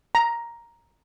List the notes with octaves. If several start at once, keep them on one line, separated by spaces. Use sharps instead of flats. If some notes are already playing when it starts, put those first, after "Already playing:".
A#5